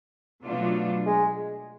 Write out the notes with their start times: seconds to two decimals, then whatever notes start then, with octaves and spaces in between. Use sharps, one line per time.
0.44 B2 F#3 A3 D4 F4
1.06 G#3